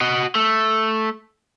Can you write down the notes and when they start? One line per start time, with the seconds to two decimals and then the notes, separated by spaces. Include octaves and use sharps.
0.01 F#4 D#5
0.35 A3